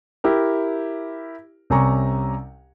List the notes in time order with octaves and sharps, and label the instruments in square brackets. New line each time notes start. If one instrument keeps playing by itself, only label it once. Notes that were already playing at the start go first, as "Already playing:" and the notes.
[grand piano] E4 G4 A#4
C2 C3 C#4 G#5 A#5 C#6